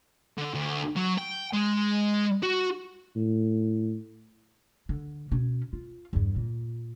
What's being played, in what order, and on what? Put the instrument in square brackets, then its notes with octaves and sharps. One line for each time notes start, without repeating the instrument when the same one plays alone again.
[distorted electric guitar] D3
D2
F#3
G5
G#3
F#4
[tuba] A2
[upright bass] D3
B2 C#4
F4
E2 G2
A#2